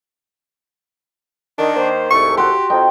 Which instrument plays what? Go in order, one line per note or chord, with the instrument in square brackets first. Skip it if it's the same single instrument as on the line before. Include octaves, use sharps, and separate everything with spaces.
[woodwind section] D#3 [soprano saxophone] D4
[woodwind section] D#3 A#3 C5
[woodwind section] C2 G#2 A3 [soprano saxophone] C#6
[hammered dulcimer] F#4 C6 [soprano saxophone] G4
[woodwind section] F2 [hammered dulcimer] D#4 G5